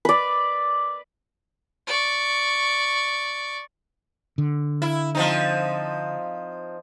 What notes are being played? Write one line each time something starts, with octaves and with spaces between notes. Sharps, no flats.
B4 D5
D5 C#6
D3
E4
F3 C4 D#4